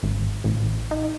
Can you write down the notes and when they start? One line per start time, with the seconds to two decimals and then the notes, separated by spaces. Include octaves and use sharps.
0.03 G#1
0.44 A1
0.91 D#4